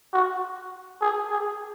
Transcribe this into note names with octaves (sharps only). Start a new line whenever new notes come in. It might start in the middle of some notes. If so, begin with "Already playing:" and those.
F#4
G#4
G#4